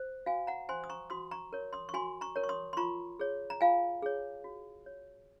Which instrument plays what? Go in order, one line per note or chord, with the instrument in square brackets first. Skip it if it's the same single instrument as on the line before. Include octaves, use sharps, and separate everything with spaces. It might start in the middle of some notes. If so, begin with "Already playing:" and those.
Already playing: [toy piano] C5
F#4 F5 G#5
F#5 A#5
C5 G#5 C6
D#6
A#5 C#6
F#4 C6 D#6
A#5 C#6
A#4 C#5
C6 D#6
C#6
F#4 G#5 C6
A#5 C#6
A#4 C#5
C#6
C6 D#6
C6
F4 A#5 C#6
G#4 C#5
A#5
F4 F5 G#5
G#4 C#5
F#4
C#5